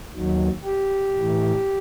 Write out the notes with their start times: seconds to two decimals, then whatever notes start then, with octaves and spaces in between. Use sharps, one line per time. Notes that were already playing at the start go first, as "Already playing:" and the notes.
0.12 D#2 D#3 F#3
0.64 G4
1.16 A2 E3